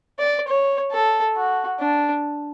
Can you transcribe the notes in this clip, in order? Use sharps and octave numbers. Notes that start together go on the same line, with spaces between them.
D5
C#5
A4
F#4
D4